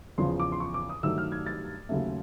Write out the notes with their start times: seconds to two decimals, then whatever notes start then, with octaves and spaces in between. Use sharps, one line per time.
0.18 E2 C#3 F3 C6
0.40 D6
0.52 C6
0.60 C#6
0.74 D6
0.89 D#6
1.03 G2 D#3 F#3 A3 E6
1.18 F6
1.32 G#6
1.46 A6
1.89 D#2 C#3 F#3 A3